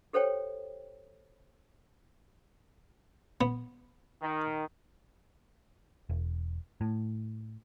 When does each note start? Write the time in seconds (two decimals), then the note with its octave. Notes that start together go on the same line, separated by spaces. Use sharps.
0.13 G4 A4 C5 C#5 G5
3.41 B3
4.23 D#3
6.09 E1
6.81 A2